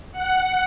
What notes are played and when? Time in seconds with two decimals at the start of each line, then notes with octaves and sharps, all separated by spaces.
0.12 F#5